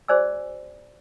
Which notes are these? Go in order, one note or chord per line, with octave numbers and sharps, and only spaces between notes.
F#4 G#4 C5 D5 G#5 E6